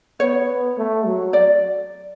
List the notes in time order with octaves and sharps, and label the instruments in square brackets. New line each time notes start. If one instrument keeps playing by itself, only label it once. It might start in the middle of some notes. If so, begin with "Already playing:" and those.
[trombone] B3 [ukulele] C#5
[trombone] A3
F#3
[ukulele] D5